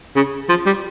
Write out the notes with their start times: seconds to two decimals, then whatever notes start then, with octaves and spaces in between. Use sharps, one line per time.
0.16 C#3
0.49 F3
0.66 G3